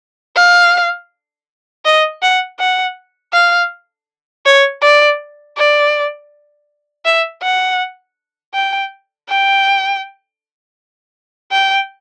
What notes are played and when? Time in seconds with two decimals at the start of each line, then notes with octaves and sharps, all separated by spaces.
0.36 F5
1.85 D#5
2.22 F#5
2.59 F#5
3.33 F5
4.46 C#5
4.82 D5
5.57 D5
7.05 E5
7.42 F#5
8.54 G5
9.29 G5
11.52 G5